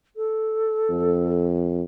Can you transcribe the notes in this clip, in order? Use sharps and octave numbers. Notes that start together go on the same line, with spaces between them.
A4
F2